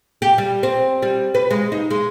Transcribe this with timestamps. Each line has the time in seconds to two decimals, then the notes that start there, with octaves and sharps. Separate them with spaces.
0.22 G4
0.38 G3
0.63 C4
1.02 G3
1.35 B4
1.51 G#3
1.72 D#4
1.91 G#3